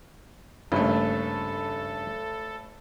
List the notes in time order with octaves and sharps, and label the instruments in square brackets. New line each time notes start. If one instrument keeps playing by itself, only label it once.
[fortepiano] G#1 A3 [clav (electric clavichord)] G2 C#3 A#3 [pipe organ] A4